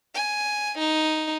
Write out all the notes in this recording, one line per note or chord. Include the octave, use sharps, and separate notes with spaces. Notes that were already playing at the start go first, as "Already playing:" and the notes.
G#5
D#4